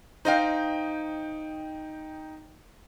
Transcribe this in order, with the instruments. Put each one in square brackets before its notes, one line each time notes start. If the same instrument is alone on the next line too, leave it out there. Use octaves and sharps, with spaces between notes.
[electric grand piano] D#4 G5 [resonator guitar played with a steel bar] C5 D#5 F5